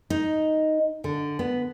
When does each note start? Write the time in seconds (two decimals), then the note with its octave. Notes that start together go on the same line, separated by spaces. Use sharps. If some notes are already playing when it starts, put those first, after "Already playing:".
0.10 D#4
1.04 D3
1.39 B3